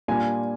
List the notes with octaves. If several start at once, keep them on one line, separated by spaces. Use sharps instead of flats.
A#2 G3 D4 F4 G#5